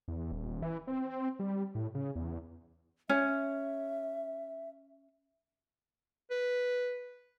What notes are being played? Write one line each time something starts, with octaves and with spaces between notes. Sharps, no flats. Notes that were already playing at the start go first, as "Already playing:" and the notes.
E2
D#1
E3
C4
G3
A2
C#3
E2
C#4 E5
B4